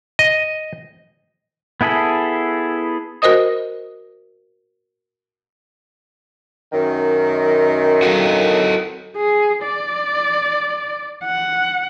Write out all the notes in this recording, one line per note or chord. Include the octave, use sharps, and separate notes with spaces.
D#5
B3 E4 G#4 A4 B5
F#4 A#4 C5 D#5 D#6
F#2 D#3
F#4 A4 D#5
G#4
D5
F#5